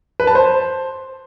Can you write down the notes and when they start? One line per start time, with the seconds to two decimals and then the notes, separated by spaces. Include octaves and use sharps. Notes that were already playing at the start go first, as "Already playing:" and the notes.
0.20 B4
0.27 A5
0.35 C5